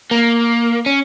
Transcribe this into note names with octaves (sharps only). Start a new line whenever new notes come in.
A#3
C#4